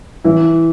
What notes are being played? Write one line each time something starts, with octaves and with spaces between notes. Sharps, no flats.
E3 E4